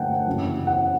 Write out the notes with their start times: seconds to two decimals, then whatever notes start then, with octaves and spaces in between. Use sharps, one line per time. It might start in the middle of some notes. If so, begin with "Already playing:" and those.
Already playing: G1 G2 A3 F#5 G5 A5
0.26 F#1 F#2 E3
0.67 F#5